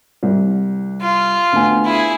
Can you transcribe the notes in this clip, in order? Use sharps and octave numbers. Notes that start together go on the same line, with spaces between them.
C2
F4
D2 B3 G#5
E4 G#4